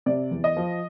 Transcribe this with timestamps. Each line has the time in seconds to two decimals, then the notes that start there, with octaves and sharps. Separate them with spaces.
0.06 C3 D5
0.31 E2
0.44 D#5
0.57 F3